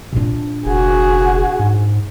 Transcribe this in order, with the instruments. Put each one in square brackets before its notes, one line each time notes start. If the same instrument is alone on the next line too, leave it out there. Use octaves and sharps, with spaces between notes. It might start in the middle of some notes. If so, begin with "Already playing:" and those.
[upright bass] A#2 D4
[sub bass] F1 [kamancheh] F#4 G#4
[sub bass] G#2